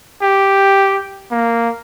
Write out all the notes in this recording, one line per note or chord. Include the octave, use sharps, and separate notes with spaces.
G4
A#3